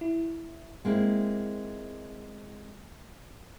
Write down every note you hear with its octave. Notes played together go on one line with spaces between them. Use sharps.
E4
G#3 A#3 C4 E4